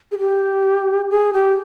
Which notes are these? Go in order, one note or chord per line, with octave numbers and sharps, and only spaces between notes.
G#4
G4
G#4
G4